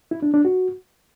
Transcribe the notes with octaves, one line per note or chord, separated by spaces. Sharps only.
E4
D4
D4
F#4